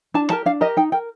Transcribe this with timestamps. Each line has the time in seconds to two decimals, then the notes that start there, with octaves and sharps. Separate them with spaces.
0.14 D4 A5
0.29 G4 A#4 A5
0.46 D4 F5
0.61 G4 A#4 D#5
0.77 D#4 G5
0.92 A#4 G5